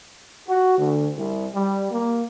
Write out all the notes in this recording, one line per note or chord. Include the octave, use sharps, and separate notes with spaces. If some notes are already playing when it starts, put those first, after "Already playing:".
F#4
D2
C2
G3
A#3